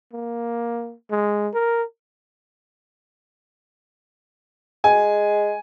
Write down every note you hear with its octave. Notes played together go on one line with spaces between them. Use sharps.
A#3
G#3
A#4
G#3 G#5